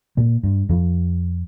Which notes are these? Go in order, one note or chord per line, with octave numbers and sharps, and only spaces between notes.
A#2 A#3
G2
F2 F3